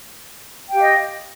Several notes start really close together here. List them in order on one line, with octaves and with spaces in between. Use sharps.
G5 G4 F5 D#5